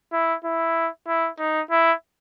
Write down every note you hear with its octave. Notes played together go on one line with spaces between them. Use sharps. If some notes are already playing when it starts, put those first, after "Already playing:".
E4
E4
E4
D#4
E4